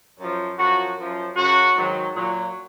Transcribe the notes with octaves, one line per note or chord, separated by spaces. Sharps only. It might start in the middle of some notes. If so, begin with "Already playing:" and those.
F#2 F3
F#2 F3 F#4
F#2 F3
F#2 C#3 F#3 F#4
G#2 D#3 F#3
A#2 F#3